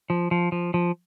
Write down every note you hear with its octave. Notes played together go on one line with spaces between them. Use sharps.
F3
F3
F3
F3